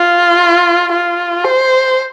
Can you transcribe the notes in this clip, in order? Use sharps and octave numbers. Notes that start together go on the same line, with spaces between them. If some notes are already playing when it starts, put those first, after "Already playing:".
Already playing: F4
F4
C5